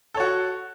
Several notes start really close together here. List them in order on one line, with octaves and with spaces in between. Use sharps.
A4 C#5 F#4